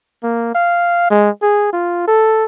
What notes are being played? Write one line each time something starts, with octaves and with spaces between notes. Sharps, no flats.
A#3
F5
G#3
G#4
F4
A4